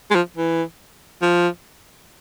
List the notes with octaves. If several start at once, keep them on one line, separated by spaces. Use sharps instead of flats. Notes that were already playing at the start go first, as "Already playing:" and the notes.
G#3
F3
E3
F3